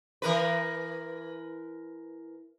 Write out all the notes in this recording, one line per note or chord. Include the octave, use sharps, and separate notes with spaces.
E3 A#4 B4